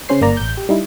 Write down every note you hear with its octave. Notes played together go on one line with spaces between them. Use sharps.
C#3 C#4 C5 C7
G1 A#3 D5 A#5
A1 G6
G4
G3 D#4 E4